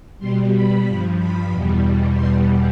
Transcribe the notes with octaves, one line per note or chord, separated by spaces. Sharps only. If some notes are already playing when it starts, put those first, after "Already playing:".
B2 G3 C6
B5
G2 F3 B5
B5
E2 B2 G3
E2 B2 G3 C6